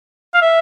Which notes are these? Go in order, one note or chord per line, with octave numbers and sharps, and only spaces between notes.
F5
E5